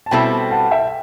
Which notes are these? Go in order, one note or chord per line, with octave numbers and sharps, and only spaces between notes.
A5
B2 G3 C4 E4 A4 G5 B5
F#5 A5
E5 G5